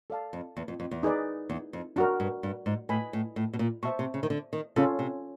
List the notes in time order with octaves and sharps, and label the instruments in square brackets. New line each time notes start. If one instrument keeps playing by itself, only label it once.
[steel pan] A4 D5 F5 A5
[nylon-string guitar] F2
E2
F2
F2
E2
[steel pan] D#4 G#4 B4 D5
[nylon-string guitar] E2
F2
[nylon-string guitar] F#2 [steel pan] D4 F#4 A#4
[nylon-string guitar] G2
G2
G#2
[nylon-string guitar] A2 [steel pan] B4 D#5 G#5 B5
[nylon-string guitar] A2
A2
B2
A#2
[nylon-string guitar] B2 [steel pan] C5 E5 A5 C#6
[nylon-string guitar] C3
C#3
D#3
D3
D#3
[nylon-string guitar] C#3 [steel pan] C#4 F4 A4
[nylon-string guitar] C3